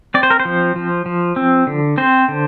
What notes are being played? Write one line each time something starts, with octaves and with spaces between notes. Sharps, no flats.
C4 D5
C5
A#4
C5
F3
F3
F3
C4
D3
C4 C5
D3